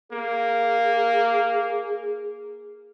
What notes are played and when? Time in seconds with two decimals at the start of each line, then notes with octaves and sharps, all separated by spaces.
0.12 A#3 G#4